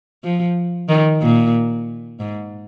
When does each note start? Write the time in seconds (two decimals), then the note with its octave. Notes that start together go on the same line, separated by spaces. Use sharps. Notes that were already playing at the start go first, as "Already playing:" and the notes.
0.24 F3
0.89 D#3
1.22 A#2
2.20 G#2